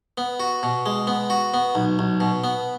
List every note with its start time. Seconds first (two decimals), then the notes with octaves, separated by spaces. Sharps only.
0.18 B3
0.40 F#4
0.63 B2
0.86 G#3
1.07 B3
1.30 F#4
1.54 B3
1.75 B1
1.99 B1
2.20 B2
2.44 B3